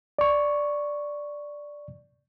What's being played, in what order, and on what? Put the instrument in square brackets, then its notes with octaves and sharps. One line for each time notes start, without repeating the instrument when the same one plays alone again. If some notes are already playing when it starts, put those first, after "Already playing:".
[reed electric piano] D5 C#6